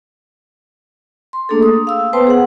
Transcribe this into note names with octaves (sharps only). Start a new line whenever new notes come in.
C6
A3 A#3 D4 G#4 A4
D#6
F5 E6
B3 B4 C5 G5 A5 C6
G#4 F#5